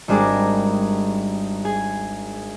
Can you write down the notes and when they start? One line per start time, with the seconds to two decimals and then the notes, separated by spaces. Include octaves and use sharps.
0.08 G#1 G3 D4 G#4 A#4
1.65 G#4